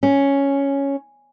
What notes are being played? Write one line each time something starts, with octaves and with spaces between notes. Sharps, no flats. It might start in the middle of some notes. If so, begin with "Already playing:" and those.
C#4